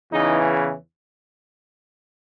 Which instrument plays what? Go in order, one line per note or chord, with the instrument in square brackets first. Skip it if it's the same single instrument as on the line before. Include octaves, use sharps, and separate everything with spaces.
[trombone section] E2 C#3 E3 D#4